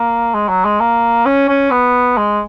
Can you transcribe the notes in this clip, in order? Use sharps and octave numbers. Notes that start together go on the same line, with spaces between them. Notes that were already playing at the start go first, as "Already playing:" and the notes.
Already playing: A#3
G#3
F#3
G#3
A#3
C#4
C#4
B3
G#3